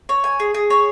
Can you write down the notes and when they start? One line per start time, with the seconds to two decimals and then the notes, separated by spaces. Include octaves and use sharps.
0.09 C#5
0.24 G#5
0.40 G#4
0.54 G#4
0.70 C#5